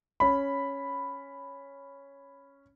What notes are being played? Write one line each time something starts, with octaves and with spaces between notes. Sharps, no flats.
C#4 B5